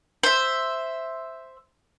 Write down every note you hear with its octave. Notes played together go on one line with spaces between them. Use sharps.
C5 E5